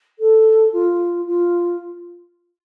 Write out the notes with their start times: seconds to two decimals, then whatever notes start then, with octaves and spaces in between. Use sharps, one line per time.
0.18 A4
0.72 F4
1.26 F4